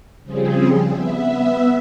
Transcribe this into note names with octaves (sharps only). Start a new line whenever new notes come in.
C#3 F3 G3 C4 G#4
B3 E5